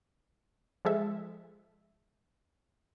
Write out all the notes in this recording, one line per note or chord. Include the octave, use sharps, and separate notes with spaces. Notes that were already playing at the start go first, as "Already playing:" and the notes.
F3 G#3 A4 E5